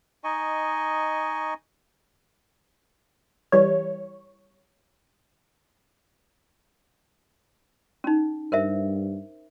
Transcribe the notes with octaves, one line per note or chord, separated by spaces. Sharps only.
D#4 D#5 G#5 C#6
E3 G3 C#5
C#4 D#4
G2 A#4 C5 E5